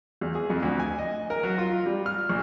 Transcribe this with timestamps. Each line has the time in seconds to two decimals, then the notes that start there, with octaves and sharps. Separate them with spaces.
0.21 E2
0.35 G#4
0.50 F2
0.62 D2
0.79 G#5
0.98 D#5
1.30 A#4
1.43 F#3
1.58 F4
1.86 G3
2.06 F6
2.29 A#1